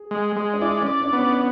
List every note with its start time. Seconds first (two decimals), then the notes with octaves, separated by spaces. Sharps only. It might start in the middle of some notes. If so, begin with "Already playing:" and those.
Already playing: G#4
0.11 G#3
0.36 G#3
0.54 D4
0.62 E4 D5
0.81 C#4
0.86 D5
1.00 D4
1.13 B3
1.19 C#4